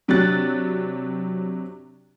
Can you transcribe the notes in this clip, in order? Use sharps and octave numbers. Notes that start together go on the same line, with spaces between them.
C3 F#3 D4 G4 F#6 A6